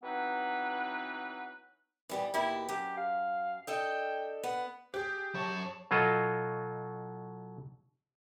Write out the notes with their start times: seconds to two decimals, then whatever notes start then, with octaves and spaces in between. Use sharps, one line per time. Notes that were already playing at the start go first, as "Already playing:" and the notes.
0.03 E3 F#3 B3 C4 D#4 B4
2.09 E3 G3 B3
2.34 D#2 B2 E4 G4
2.69 F#2 G4
2.97 F5
3.67 D4 A4 D#5 G5
4.43 B3 F#5
4.94 G4 G#4
5.34 F#2 C#5 A5
5.91 B2 F#3 F4 A4 D#5